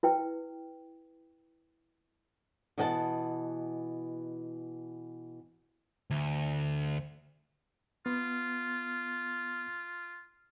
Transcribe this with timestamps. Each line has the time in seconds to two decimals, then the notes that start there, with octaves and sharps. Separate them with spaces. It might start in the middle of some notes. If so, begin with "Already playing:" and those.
0.03 E4 B4 G5
2.78 B2 E3 D#5 F#5 G5 A5
6.10 D2
8.06 B3 F4